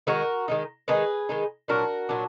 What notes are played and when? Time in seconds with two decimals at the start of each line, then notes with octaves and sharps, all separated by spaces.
0.07 D#3 G#3 D#4 F#4 A#4
0.48 D#3 G#3 D#4
0.88 D#3 G#3 D#4 G#4 B4
1.29 D#3 G#3 D#4
1.68 A#2 F#3 D4 F#4 A#4
2.09 A#2 F#3 D4